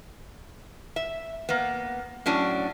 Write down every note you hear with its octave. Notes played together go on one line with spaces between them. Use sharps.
E5
A#3 B3
A2 F#3 C#4 D4